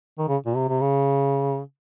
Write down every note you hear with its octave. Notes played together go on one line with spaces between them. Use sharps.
D#3
C#3
A#2
C3
C3
C#3